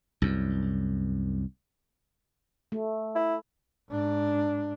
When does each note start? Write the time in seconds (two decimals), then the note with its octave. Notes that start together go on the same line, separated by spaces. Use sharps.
0.22 C2 F#2
2.72 A3
3.15 E4
3.90 G#2 D4